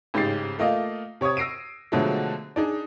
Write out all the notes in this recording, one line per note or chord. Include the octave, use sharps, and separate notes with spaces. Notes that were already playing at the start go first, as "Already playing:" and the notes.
A1 G#2 C#3 G4 A6 C7
A3 A#3 F4 D#5 F5
C3 C#5 C#6 D#6 G#6
E6 A#6 C7 D7 D#7
B2 D3 F3 F#3 G#3 A3
D4 D#4 G#4